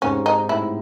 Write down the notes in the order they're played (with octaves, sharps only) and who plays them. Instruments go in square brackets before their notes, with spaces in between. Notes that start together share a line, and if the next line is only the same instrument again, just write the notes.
[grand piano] G#2 C3 [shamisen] C#4
[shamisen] D#4
[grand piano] A2 [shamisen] E4